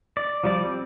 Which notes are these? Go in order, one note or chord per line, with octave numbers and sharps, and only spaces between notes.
D5
F3 G3 D5
C4